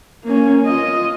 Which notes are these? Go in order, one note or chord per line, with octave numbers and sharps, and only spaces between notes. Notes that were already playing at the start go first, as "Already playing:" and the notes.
A#3 C#4
F4 D#5